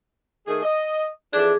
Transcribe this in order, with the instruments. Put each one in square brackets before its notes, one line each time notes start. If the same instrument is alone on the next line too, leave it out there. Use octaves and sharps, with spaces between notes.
[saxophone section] D#3 A3 G#4
D#5
[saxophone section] F2 E3 D4 [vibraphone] G#4 D6